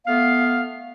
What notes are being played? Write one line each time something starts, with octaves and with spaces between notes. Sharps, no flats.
A3 B3 F5